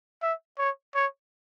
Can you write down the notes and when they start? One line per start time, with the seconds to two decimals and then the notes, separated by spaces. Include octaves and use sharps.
0.22 E5
0.58 C#5
0.95 C#5